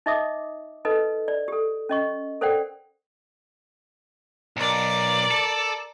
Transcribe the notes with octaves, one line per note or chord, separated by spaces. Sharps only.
D#4 D#5 E5 D6 D#6
D#4 A4 B4 D#5
D5
G4 A4
C#4 D#5 C#6
A4 A#4 C5 D5 F#5 G5
B1 A#4 D5
A4